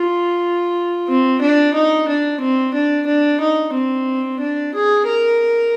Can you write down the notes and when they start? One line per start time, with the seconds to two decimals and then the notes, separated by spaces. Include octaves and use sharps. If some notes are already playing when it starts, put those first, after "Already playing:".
Already playing: F4
1.08 C4
1.41 D4
1.74 D#4
2.08 D4
2.41 C4
2.74 D4
3.07 D4
3.41 D#4
3.74 C4
4.40 D4
4.74 G#4
5.07 A#4